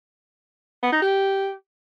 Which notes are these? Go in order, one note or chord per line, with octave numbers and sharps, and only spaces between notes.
B3
D#4
G4